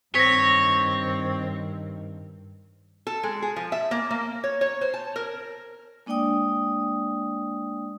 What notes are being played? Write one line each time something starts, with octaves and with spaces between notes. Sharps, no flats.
G2 D#3 C4 C#5 A#6 B6
A4
G#3
G#4
F3
E5
A#3
A#3
C#5
C#5
C5
A5
A#4
G#3 A#3 D4 D5 G5 D#6